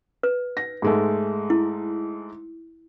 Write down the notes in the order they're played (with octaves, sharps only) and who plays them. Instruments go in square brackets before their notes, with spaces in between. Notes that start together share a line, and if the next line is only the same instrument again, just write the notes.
[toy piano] B4
[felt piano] A#6
G#2 G#3 A3
[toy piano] E4